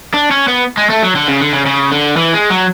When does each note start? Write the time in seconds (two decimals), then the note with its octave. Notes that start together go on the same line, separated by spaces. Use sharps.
0.14 D4
0.31 C#4
0.48 B3
0.77 G#3
0.90 A3
1.03 F#3
1.16 D3
1.28 C#3
1.41 D3
1.53 C#3
1.66 C#3
1.92 D3
2.17 E3
2.33 G#3
2.50 F#3